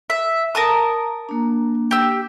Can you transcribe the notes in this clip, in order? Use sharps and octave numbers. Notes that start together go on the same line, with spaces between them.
E5
A#4 A5 D#6
A#3 D4
G4 E6